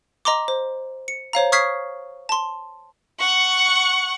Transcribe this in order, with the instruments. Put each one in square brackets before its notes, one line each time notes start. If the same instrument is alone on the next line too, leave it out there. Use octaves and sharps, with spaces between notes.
[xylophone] D#5 A#5 C6 D6
C5
C#7
C5 C#5 F5 A#5
C#6 D#6 F6 G#6 B6 C7
A5 C6
[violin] F#5 C#6